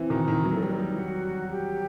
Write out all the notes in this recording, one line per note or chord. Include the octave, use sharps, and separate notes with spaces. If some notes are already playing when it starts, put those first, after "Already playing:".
Already playing: E3 C4
D#3 F#4
D#3 E4
F#3 B4
A4
G3 B4
D#4
G3
F#4
G4